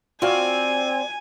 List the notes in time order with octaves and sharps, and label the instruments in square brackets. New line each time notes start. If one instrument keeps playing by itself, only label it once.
[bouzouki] C4 [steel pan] F4 F#4 F5 [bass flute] D5 [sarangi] G#5